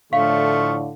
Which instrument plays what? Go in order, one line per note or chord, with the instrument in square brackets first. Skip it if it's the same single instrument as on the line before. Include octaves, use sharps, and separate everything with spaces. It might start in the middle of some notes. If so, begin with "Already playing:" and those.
[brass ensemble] A2 D3 [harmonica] F3 A3 C#6 [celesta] F5